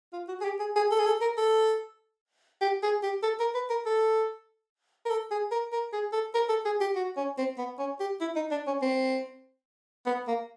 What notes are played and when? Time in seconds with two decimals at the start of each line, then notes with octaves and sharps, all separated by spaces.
0.13 F4
0.28 F#4
0.41 G#4
0.45 G4
0.60 G#4
0.76 G#4
0.91 A4
0.99 G#4
1.06 A4
1.21 A#4
1.38 A4
2.61 G4
2.83 G#4
3.03 G4
3.23 A4
3.40 A#4
3.55 B4
3.70 A#4
3.86 A4
5.06 A#4
5.10 A4
5.31 G#4
5.52 A#4
5.73 A#4
5.93 G#4
6.13 A4
6.35 A#4
6.49 A4
6.65 G#4
6.81 G4
6.96 F#4
7.17 C#4
7.38 C4
7.58 B3
7.79 C#4
8.00 G4
8.21 E4
8.36 D#4
8.51 D4
8.67 C#4
8.82 C4
10.07 B3
10.27 A#3